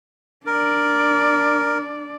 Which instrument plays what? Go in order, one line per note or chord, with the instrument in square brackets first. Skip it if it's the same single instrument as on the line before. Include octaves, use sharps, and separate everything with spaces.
[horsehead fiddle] D4 D5 [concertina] A#4